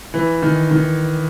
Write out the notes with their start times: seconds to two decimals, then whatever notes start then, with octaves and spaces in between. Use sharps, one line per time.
0.14 E3
0.42 D#3
0.71 D#3